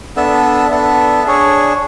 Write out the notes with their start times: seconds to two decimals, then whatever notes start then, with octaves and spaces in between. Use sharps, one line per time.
0.16 B3 D4 A4 E5
0.70 B3 D4 A4 E5
1.24 D4 G#4 C#5